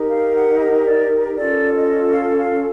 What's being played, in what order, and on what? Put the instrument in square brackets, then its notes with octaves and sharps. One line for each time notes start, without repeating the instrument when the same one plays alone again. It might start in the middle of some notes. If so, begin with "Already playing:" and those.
Already playing: [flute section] D#4 G4 A#4
F5
F#5
D#5
D5
C#4 F4 A4 D5
D#5
F5
F5